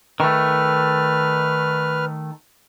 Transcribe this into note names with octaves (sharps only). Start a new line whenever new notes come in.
D#3 A3 B4 F6